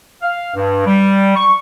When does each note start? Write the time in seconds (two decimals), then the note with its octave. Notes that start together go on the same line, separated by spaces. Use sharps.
0.22 F5
0.55 G2
0.86 G3
1.36 C#6